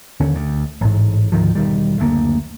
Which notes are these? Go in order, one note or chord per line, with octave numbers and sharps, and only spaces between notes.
D#2 D3 C#4
D2
A1 G#2
D2 G#2 D#3 F3
E1 D#3 G3
F#1 D2 A#3